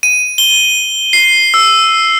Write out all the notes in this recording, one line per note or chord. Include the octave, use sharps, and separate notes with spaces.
D#7
G7
C7
E6